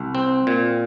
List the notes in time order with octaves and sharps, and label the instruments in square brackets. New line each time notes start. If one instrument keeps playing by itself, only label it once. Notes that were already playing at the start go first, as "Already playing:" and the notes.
Already playing: [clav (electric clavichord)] C2
C4
A#2